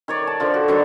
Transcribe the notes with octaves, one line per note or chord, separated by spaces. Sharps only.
D#3 C#5 D5
A5
D3 F3
F#4
D3 D#3 F#3